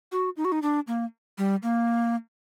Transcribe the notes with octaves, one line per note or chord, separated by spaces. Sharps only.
F#4
D#4
F#4
D#4
D4
A#3
G3
A#3